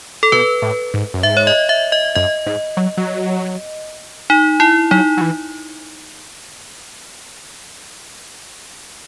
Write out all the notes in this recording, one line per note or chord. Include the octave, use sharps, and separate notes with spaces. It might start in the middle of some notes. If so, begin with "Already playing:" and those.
A4
B2 B4
A2
G#2
F#2
G#2 E5
C#5
D#5
E5
D#5
F#2 D#5
G#2
F#3
F#3
D#4
E4
F#3 D#4
F#3
E3